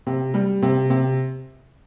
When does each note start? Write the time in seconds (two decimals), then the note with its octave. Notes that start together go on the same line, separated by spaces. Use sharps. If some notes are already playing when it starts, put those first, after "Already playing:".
0.07 C3
0.34 G3
0.62 C3
0.90 C3